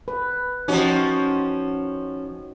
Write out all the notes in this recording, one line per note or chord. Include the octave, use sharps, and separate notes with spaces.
B4
F3 C#4 D#4 F#4 G4